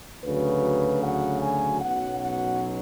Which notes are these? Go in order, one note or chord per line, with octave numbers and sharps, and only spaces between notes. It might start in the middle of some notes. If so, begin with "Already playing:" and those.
D2 C#3 F#3 B4
F#5
G#5
B1 B2 F#3 C#4 F#5
F#5